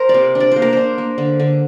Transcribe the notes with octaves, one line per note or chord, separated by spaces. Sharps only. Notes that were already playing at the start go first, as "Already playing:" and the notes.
Already playing: A#4 C5
D5
C3
D4
D5
A#3 C5
A#4
D4 C5
A#3
D3
D3